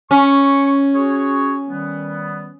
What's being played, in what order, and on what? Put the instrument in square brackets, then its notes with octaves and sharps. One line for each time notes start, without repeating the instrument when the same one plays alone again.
[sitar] C#4 [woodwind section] C#6
[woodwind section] F#4 G#4 C#5
D#3 G3 B3